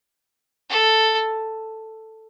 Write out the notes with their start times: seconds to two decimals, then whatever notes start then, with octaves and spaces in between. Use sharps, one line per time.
0.70 A4